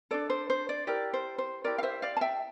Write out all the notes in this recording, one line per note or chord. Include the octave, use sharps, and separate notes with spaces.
D4 F4 A4 D5
C5
C5
D5
E4 G4 A#4 D5
C5
C5
E4 G4 A#4 D5
F5
C5 E5
D5 F5
A5
E5 G5